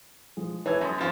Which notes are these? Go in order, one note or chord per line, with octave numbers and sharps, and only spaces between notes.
F3 G#3
E3 C#5 A5 G#6
F#2 A5 C6 D#6
G#1 F3